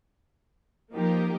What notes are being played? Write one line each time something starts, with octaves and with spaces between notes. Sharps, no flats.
F3 A#3 D#4 G4 A#4